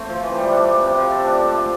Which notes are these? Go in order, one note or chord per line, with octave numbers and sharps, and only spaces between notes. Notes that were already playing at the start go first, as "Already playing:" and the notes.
Already playing: A3 C4
F3
E3
G3
D4
A3
C3
F3
A4
D4
A4
A3